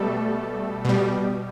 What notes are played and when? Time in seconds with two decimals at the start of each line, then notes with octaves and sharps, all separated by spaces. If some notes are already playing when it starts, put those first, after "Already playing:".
Already playing: B2 G3 A3 A4
0.85 B2 G3